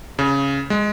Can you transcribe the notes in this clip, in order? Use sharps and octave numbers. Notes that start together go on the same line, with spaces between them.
C#3
G#3